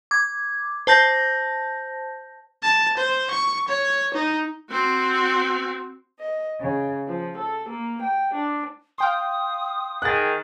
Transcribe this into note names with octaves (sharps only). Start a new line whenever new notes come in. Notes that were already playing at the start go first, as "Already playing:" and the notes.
D6 G#6
C5 A5 G6 A#6
A5
C5
C#6
C#5
D#4
C4 F#4
D#5
C#3
F3
A4
A#3
G5
D4
F5 G5 C6 D#6
D#3 G#4 F#6 A6